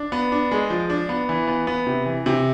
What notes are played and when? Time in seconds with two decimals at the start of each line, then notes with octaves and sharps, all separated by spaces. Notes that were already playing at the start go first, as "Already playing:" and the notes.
Already playing: D4
0.12 B3
0.32 D4
0.51 G#3
0.70 F3
0.90 D4
1.09 B3
1.29 E3
1.47 B3
1.67 B3
1.87 C3
2.06 E3
2.26 C3